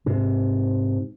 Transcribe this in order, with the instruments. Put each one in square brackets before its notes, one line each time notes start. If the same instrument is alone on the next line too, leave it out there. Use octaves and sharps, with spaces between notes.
[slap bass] G#2 C3